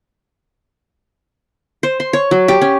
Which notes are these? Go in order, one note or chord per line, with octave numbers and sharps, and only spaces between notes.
C5
C6
C#5
F#3
G4
C#4